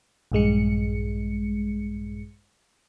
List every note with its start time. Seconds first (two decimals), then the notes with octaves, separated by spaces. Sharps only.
0.32 A#1 G2 G#3 C#7